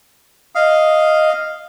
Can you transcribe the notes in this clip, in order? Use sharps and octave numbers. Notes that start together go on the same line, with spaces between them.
D#5 F5